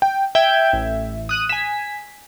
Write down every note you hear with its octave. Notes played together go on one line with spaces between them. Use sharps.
G5
E5 G5 G6 G#6
A1
D#6 F#6 D#7
G#5 B6 E7